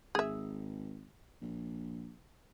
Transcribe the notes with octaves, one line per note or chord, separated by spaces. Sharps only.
G#1 G#4 E5
A#1